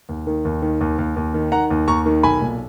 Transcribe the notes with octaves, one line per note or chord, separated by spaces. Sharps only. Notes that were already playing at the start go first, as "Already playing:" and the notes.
D#2
D#3
D#2
D#3
D#2
D#2
D#2
D#3
D#3 F#5 A#5
D#2
D#2 A#5 C#6
D#3
B1 G#5 B5
A#2